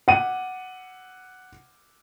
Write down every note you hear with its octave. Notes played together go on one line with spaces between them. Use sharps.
F#5 D#7